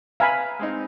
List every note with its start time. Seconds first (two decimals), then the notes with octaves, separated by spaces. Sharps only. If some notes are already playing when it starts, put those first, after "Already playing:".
0.20 B4 E5 F5 G#5 A#5 B5
0.59 G#3 C4 D#4